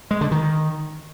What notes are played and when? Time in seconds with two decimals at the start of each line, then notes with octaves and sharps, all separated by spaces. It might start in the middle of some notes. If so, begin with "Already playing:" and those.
0.11 G#3
0.21 D3
0.31 D#3